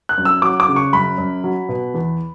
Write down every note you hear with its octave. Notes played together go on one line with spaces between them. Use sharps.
F#6
F#2
E6
F#3 D6
D6
C#3
C#6
F#2 B5
F#2
F#3
B2
E2